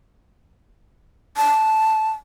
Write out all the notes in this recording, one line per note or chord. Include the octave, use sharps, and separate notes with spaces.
A5